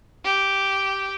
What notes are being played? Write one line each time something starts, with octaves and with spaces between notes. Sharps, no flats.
G4